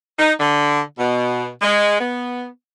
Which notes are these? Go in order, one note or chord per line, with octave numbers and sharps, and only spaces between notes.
D#4
D3
B2
G#3
B3